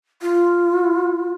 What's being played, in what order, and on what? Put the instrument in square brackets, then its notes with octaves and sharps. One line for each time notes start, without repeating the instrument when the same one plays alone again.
[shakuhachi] F4